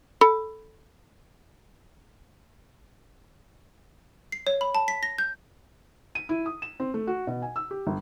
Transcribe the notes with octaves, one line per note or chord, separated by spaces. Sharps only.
A4 B5
C7
C#5
B5
A5
B6
A#6
G6
D#7
E4
D#6
E7
C4
A3
F#4
B2
G#5
E6
G4
G1